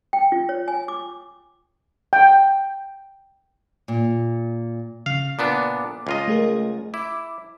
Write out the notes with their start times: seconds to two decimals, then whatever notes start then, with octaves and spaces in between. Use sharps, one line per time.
0.13 G5
0.32 F4
0.49 C#5
0.68 G#5
0.88 D6
2.13 G5
3.88 A#2
5.06 C#3 F5
5.39 A#2 B3 D4 D6
6.07 C#2 F4 D#5
6.28 A3 G#4 A#4
6.94 E4 D6